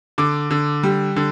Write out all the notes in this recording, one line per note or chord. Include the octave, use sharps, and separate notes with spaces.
D3 D6
D3
G3
D3